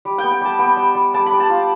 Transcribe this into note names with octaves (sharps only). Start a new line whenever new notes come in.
G3
B3 G5
G5
G3 A5
B3 G5
G3
G3
G3 A5
B5
G3
A5
F4